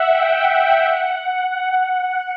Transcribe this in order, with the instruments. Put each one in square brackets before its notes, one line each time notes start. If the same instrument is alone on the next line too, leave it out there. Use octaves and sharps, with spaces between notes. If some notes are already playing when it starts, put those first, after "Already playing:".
Already playing: [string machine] E5 F#5
G5
F#5
F#5
F#5